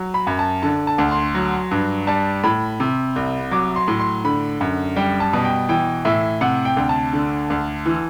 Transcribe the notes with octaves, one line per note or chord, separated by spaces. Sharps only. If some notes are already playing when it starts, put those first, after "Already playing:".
Already playing: F#3
B5
F#2
A5
D3 A5
A5
D2
C6
F#3
G2
G3 A5
A2 B5
C3
C2
F#3 D6
C6
A2
C6
D3 B5
F#2
G3 G5
A5
B2
G5
E3 G5
A2 E5
C3 F#5
G5
D2
A5
D3
D2
E3